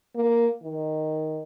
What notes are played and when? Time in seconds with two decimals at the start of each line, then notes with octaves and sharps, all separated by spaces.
0.15 A#3
0.62 D#3